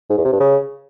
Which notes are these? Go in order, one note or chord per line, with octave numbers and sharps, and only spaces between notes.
G#2
E2
C3
G2
C#3